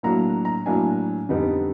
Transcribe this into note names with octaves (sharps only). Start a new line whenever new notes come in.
A2 F#3 A#3 D4 A#5
A#5
A2 F#3 A#3 D4 G#5
F2 D3 G3 B3 D#4